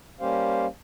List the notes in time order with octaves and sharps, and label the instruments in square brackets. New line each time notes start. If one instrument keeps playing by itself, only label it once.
[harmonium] G3 A#3 C#4 G4 C5 F5